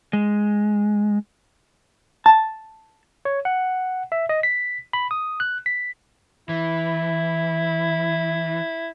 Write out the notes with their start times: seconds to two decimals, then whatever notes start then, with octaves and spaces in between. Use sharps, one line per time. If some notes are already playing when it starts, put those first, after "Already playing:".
0.13 G#3
2.26 A5
3.25 C#5
3.45 F#5
4.12 E5
4.29 D#5
4.43 B6
4.93 B5
5.11 D#6
5.40 F#6
5.66 B6
6.49 E3 E4